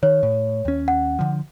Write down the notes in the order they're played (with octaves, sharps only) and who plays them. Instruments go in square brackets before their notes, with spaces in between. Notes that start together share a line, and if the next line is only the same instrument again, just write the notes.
[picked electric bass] D#3 [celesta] C#5
[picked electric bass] A2
D#2 C#4
[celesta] F#5
[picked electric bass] D3 F3